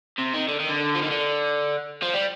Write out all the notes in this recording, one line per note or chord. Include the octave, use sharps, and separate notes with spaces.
C3
D#3
D3
D#3
D3
F3
D#3
D3
F3
G3